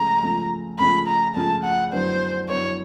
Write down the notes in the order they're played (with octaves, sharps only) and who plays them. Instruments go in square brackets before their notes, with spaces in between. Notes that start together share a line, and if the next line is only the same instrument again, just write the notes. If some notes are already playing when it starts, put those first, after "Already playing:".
Already playing: [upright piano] C#2 C#3 F3 A3 [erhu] A#5
[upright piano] C#2 C#3 F3 A3
[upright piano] C#2 C#3 F3 A3 [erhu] B5
[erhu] A#5
[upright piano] C#2 C#3 F3 A3 [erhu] A5
[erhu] F#5
[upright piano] F#2 D3 F#3 B3 E4 [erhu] C5
[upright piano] F#2 D3 F#3 B3 E4 [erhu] C#5